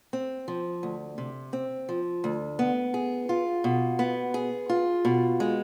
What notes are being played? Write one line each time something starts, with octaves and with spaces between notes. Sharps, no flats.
C4
F3
D2
C3
C4
F3
D2
B3
G#4
F4
B2
B3
G#4
F4
B2
G#3